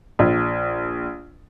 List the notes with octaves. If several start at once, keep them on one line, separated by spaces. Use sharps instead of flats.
A#1